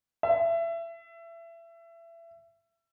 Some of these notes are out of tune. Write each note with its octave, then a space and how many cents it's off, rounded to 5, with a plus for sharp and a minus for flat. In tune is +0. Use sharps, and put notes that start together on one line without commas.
E5 +25